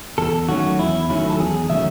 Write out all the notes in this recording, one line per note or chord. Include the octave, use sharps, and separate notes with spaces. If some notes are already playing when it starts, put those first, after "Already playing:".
E2 A4
D#3 F#3 A3 C#4 F#4
E2 E4
D#3 F#3 A3 C#4 E4
A4
E2 G#4
D#3 F#3 A3 C#4 E5